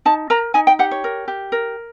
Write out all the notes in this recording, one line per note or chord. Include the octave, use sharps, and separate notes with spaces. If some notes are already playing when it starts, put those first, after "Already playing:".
D#4 A5
A#4 A#5
D#4 G#5
G5
G4 F#5
C#5
A#4
G4
A#4